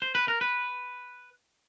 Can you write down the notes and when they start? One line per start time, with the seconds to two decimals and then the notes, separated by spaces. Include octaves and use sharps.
0.02 C5
0.15 B4
0.28 A#4
0.41 B4